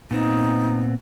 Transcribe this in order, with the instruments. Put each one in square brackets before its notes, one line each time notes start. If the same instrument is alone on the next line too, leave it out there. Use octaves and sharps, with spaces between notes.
[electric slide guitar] A#2 B3 C4 [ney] D#4